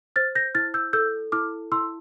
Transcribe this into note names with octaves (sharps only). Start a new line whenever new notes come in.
C5 F6 A6
G6 A#6
E4 F6 A6
E6 G6
A4 E6 G6
E4 D6 F6
E4 C6 E6